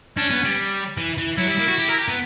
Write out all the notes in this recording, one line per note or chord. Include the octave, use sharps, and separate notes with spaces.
C#4 D4
B3
G3
E3
E3
F#3 E4
G3
A#3
F#4
G4
A#4
G4
B3